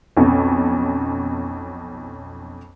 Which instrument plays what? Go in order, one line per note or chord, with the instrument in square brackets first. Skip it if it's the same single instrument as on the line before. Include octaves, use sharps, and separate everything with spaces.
[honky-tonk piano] B1 F2 C#4